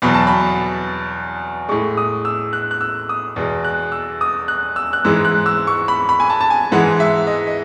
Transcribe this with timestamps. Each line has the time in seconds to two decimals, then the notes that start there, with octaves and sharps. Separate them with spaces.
0.02 E2 B2 F#3 B5
0.14 A5
0.27 B5
1.69 A2 G#3 C#6
1.97 D#6
2.25 E6
2.53 F#6
2.71 F#6
2.81 E6
3.09 D#6
3.36 E2 B2 G#3
3.64 F#6
3.92 E6
4.21 D#6
4.48 F#6
4.76 E6
4.93 F#6
5.05 G#2 E3 G#3 E6
5.25 F#6
5.46 E6
5.67 C#6
5.88 B5
6.09 B5
6.20 G#5
6.30 A5
6.41 A5
6.50 G#5
6.72 G#2 E3 G#3 F#5
7.00 E5
7.27 D#5
7.47 D#5